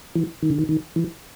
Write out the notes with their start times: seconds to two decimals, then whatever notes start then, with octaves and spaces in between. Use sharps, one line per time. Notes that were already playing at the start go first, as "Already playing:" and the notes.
0.15 E3
0.42 D#3
0.50 D3
0.59 D#3
0.69 D#3
0.96 E3